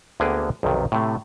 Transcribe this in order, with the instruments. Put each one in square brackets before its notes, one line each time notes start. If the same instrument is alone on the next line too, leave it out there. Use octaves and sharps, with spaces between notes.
[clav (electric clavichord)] D2 D3 A#3 B3 G#4 G5
B1 F2 C3 D#3
A2 C3 A3